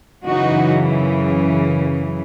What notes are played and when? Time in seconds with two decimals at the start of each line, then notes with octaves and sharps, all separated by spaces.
0.25 F#2 C#3 E3 D#4 F#4